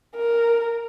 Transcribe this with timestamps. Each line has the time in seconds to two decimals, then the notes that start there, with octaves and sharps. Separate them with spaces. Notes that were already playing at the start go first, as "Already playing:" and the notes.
0.16 A#4